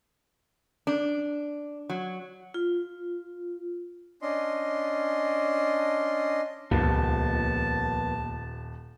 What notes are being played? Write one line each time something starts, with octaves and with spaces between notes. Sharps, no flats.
D4
F#3
F4
C#4 D4 D#5 C6
D#1 C#2 F3 A#3 B3 A5